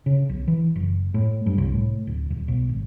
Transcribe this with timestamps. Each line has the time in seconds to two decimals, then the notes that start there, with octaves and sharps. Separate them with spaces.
0.06 C#3
0.29 B1
0.48 E3
0.76 F#1
1.14 A2
1.46 G2
1.58 C2
1.74 A2
2.07 D1
2.30 D#1
2.48 B1
2.69 G#1